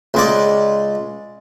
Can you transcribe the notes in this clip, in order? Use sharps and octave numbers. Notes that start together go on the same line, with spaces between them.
C#2 G#3 D5